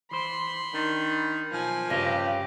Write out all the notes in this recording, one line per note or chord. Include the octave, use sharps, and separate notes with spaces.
E3 C5 B5 C6
D#3 D4
B1 F3 G#5
G2 C#3 G4 D#5 F5